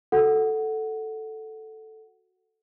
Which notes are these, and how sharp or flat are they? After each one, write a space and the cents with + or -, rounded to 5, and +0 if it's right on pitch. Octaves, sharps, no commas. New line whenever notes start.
F#4 +0 A4 +0 F#5 +0